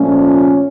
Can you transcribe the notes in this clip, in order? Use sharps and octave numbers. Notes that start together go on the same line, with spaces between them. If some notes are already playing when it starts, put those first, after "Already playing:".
Already playing: A#2 F3 A3 C#4